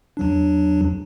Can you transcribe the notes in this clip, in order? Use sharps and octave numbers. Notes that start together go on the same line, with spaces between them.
E2 F#3 D4